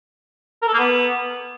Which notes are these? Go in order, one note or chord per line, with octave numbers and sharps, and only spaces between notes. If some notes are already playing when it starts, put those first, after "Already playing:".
A#4
A4
A#3
B3